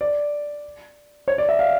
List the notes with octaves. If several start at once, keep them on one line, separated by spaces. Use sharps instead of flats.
D5
C#5
D5
E5
F5